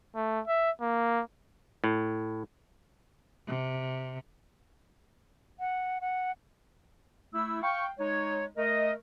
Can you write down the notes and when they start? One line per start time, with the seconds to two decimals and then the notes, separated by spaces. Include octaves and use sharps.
0.16 A3
0.48 E5
0.81 A#3
1.84 A2
3.47 C3
5.60 F#5
6.01 F#5
7.33 A3 E4 E6
7.63 F5 G5 C#6
7.98 G#3 D#4 C#5
8.57 A3 A#4 D#5